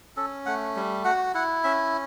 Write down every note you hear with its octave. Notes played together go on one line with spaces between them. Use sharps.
C#4 A4
A3 F#5
G3
F#4 F#5
E4 F#5
C#4 E5